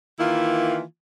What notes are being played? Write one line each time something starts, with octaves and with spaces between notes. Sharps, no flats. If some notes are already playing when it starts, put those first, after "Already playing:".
D#3 E3 A#3 E4 F4